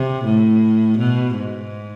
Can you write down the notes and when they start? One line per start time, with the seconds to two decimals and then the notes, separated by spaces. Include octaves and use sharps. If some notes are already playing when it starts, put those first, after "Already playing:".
Already playing: C3
0.25 A2
0.98 B2
1.35 G#2